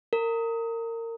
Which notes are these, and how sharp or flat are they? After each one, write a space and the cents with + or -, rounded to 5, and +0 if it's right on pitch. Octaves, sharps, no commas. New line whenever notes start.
A#4 -25